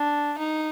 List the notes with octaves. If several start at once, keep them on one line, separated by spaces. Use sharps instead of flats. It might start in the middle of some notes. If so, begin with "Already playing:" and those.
Already playing: D4
D#4